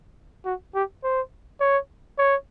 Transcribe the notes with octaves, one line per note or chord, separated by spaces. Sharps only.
F#4
G4
C5
C#5
C#5